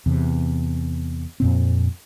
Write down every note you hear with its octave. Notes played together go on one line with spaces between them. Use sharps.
E2 C3
F2 A#2 C4